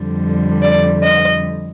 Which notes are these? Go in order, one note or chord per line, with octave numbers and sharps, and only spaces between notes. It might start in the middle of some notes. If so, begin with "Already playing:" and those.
Already playing: F2 D3 G3
D5
D#5